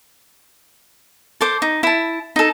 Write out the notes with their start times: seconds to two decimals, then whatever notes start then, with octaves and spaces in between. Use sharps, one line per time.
1.41 A4 C5 D6
1.62 D#4
1.83 E4 A5
2.36 D#4 A4